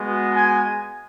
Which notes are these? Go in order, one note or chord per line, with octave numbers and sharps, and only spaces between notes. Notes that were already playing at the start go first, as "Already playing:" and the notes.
Already playing: G#3 B3 F#4
G#5